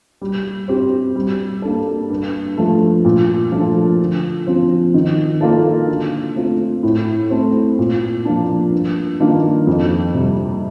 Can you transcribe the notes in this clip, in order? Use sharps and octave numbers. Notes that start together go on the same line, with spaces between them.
G3
C4 G4
G3
A#3 D4 A4
G2
F3 A3
A#2
F3 A3 D4 A4
D3
F3 C4
D#3
A#3 F4 A4
D3
A3 C4 F4
A2
A3 C4
A#2
F3 A#3 D4
G2
D#3 A#3 D4 F4
F2
C3 G3